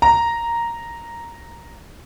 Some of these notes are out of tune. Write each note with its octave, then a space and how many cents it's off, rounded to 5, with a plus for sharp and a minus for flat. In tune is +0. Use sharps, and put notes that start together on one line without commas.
A#5 +0